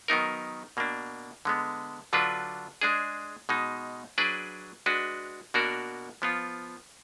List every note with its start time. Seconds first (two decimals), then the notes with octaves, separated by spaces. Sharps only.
0.08 D#3 F#3 B3 D#4 A#4
0.77 B2 A#3 D4
1.45 D3 G#3 B3
2.13 D3 F#3 D4 F4 B4
2.81 G#3 D4 G#4
3.49 B2 G#3 D#4
4.18 F#3 D4 G#4 B4 D5
4.86 G#3 D4 F#4 B4
5.54 B2 A#3 D4 F#4 A#4
6.22 F3 B3 F4